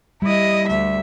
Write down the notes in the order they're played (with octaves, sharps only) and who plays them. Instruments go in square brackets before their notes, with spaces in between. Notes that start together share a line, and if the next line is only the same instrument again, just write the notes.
[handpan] G3 [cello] E4 D#5
[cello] D2 E5